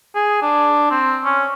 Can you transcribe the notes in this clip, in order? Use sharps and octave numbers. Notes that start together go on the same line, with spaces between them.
G#4
D4
C4
C#4